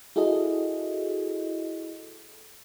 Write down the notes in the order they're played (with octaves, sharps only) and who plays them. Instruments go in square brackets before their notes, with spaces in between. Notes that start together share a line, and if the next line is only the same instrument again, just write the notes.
[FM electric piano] E4 F#4 G#4 A4 D#5